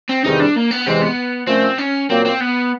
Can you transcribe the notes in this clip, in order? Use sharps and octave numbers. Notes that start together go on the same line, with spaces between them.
C4
E2 C3 D#3 G3 D#4
D4
A#3
B3
E2 C3 E3 G#3 C4
B3
A#2 F3 A3 C4 C#4
C#4
A#2 F#3 A#3 C4
C4
B3